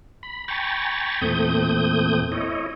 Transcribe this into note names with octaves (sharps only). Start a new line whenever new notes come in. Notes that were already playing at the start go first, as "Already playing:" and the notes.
B5
G5 G#5 A#5 B5 C#6 A6
E2 A#2 A3 C4 D#6 G6
E4 C#5 D#5